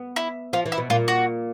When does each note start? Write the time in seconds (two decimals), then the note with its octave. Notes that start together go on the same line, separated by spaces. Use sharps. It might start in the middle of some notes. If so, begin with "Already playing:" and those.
Already playing: B3
0.16 E4
0.53 F3 F4
0.66 E3
0.72 E4
0.78 B2
0.90 A#2 F4
1.08 F#4